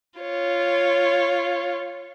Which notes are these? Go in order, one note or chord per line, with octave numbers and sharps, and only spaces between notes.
F4 C#5